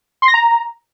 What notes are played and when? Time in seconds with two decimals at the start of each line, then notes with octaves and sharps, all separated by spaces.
0.22 C6
0.28 A#6
0.34 A#5